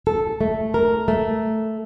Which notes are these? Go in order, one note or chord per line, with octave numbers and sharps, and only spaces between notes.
A4
A3
A#4
A3